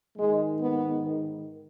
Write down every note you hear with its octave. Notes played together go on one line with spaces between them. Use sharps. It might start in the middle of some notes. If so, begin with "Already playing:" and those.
G#2 D#3 G#3
B3